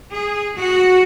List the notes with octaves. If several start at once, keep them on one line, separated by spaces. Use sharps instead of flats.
G#4
F#4